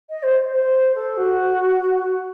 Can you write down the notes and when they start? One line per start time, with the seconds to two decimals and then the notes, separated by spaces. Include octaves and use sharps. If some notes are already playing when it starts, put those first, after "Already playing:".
0.09 D#5
0.22 C5
0.52 C5
0.95 A4
1.17 F#4